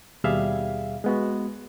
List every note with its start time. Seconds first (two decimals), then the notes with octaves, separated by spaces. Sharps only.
0.24 D#2 B2 G3 G#4 E5 F5
1.04 G#3 B3 F#4